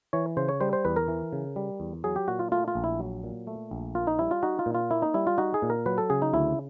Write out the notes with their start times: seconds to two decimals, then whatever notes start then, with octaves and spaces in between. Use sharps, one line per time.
0.13 E3 C#5
0.37 C#3 C5
0.49 C#5
0.61 G3 C5
0.73 C5
0.85 E2 B4
0.96 A#4
1.08 E3
1.33 C#3
1.56 G3
1.80 E2
2.04 F#3 G#4
2.16 G4
2.28 A#2 F#4
2.39 F4
2.52 A3 F4
2.68 F4
2.75 A#1
2.84 E4
2.99 F#3
3.24 A#2
3.47 A3
3.71 A#1
3.95 A#3 F4
4.07 D#4
4.19 G3 E4
4.31 F4
4.43 D#4 F#4
4.59 F4
4.66 A#2
4.75 F4
4.91 A#3 E4
5.02 D#4
5.14 G3 E4
5.27 F4
5.38 D#4 F#4
5.54 G#4
5.62 A#2
5.70 A#4
5.86 F#3 B4
5.98 A4
6.10 C#3 G#4
6.22 D#4
6.34 D2 E4